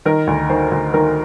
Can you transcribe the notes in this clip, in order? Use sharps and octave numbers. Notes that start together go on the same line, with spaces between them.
D#3 A#4
D2
D#3 C5
D2
D#3 A#4